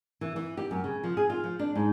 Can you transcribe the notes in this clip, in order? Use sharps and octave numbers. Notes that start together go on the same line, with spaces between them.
E3
E3
G4
F#2
C#3
F3
G#4
F4
F3
D4
G#2